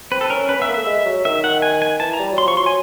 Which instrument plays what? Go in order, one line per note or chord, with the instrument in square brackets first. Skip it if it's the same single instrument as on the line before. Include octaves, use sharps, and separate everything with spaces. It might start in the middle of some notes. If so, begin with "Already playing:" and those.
[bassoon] C4 [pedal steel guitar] B4
[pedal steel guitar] A4
[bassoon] C#4 [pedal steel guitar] A#4
[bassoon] C#4 [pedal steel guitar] B4
[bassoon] B3 [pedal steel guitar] E5
[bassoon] A#3
[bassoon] A3 [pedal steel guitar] E5
[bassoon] G#3
F#3
[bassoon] D#3 [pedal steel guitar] E5
[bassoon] D#3 [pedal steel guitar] F#5
[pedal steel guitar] G#5
G#5
[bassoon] E3 [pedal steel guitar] A5
[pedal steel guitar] A#5
[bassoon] G3
F#3
[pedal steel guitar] C6
[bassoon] F3 [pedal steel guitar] C#6
[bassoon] F#3 [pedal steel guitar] C6
[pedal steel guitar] G#5